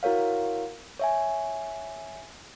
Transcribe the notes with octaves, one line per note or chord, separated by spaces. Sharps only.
E4 F#4 A#4 C#5 F5
C#5 E5 G#5